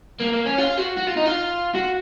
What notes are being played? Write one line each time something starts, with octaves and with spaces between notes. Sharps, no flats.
A#3
A#3
C#4
F4
F#4
F#4
F4
D#4
F4
F#4